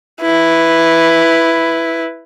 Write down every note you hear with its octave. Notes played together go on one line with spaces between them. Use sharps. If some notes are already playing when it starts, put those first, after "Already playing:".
E4 B4